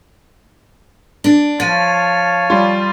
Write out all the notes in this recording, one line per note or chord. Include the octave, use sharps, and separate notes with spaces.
D4
F3 C#5 F5 A5 A6 D#7
G3 F4